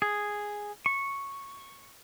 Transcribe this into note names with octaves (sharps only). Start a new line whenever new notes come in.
G#4
C#6